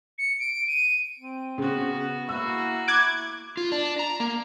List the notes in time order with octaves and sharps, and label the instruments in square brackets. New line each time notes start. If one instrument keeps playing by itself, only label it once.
[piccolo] C#7
D7
D#7
[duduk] C4
[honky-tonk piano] C#3 [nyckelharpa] B3 F#4
[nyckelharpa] A#3 F#4 [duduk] E4 [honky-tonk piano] E6
[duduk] E4 [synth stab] D6 F#6 G#6
[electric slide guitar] F4
D4
A#5
A#3